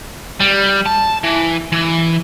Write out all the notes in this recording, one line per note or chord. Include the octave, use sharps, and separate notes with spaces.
G3
A5
E3
E3